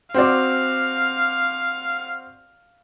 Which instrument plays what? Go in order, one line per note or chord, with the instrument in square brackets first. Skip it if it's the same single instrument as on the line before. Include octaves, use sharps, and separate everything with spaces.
[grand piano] C4 F#4 D5 [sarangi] F5